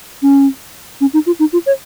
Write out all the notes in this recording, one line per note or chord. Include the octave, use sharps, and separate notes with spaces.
C#4
C#4
D#4
F4
D#4
F4
C#5